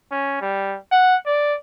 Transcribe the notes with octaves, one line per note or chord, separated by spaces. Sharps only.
C#4
G3
F#5
D5